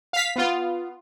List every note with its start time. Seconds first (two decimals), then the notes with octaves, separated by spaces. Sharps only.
0.13 F5 B6
0.36 B3 F4